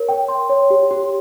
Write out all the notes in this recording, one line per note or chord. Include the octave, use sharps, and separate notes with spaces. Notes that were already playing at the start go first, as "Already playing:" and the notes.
Already playing: A#4 C#5
G5
C6
C#5
G4
G4